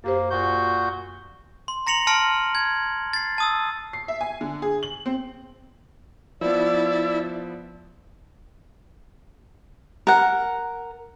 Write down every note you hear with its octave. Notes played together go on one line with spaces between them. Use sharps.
F#2 A#3 G4 C5
A#2 F#4 G6
C6
A#5 A#6 C#7 F7 F#7
A5 C6 F6 A#6 C#7 D7
G#6
A6 C7
A5 D#6 E6
C7
E5
G#5
D3
G#4
F#7
C4
F3 B3 E4 D5
A#4 F#5